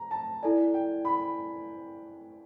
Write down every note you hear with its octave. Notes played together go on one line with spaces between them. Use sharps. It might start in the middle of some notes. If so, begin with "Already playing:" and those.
Already playing: A#5
A5
E4 A4 D5 G#5
G5
B5